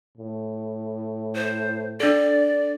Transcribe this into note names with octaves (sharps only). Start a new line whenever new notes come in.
A2
C5
D4 A4 D5